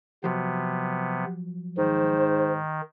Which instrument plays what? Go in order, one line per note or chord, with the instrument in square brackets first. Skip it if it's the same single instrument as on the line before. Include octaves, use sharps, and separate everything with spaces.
[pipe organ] C3 B3 [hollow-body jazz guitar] F3 F#3
[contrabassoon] G#2 [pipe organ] D#3 [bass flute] C5